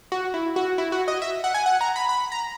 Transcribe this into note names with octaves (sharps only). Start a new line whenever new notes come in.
F#4
E4
F#4
E4
F#4
D#5
E5
F#5
G#5
F#5
A#5
B5
B5
A#5